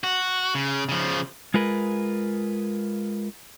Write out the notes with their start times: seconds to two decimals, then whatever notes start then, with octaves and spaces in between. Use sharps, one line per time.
0.04 F#4
0.55 C#3
0.89 C#3 F3
1.54 G#3 F4 G#4 A#4 B4